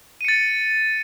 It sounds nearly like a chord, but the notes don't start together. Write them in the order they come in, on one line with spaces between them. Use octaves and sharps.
D#7 C#7 A6